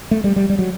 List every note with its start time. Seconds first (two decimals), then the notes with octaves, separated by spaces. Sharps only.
0.11 A3
0.24 G3
0.36 G3
0.49 G3
0.59 F#3